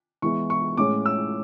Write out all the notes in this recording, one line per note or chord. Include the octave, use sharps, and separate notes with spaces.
E3 G#3 B3 E4 C#6
C#6
A2 G#3 C#4 D6
E6